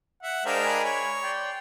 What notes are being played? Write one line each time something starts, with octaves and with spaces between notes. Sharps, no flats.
E5 F#5
G#3 D4 A#4 C5 F5 G5
G#5 B5
C#5
D5 G5 C6